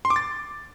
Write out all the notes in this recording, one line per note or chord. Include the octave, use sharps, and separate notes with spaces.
C6
D6
A6